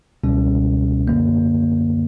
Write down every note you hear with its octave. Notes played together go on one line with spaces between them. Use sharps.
C#2 B2 G3 C#4
F#2 D3 A#3